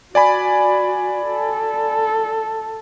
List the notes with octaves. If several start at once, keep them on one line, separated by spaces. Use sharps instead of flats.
F#4 D5 G#5 B5
A4